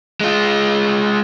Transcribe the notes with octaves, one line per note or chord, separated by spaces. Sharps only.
G#3 F4